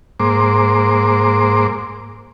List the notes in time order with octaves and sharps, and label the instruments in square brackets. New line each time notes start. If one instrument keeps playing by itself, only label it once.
[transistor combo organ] G#2 A#3 C5 D6